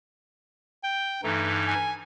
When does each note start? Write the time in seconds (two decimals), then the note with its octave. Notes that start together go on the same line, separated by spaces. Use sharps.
0.83 G5
1.23 G2 E3 A3 D#4
1.68 G#5